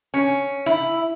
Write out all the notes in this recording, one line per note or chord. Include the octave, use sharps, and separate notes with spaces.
C#4
E4